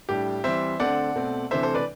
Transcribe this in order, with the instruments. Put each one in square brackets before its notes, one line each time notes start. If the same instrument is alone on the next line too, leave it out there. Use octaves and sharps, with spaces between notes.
[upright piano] A2 G3 D4 G4
E3 G3 C4 C5 E5
D3 A3 C4 D5 F#5
B2 A3 C4
C3 E3 A3 D4 C5 E5
A4 C5
B4 D5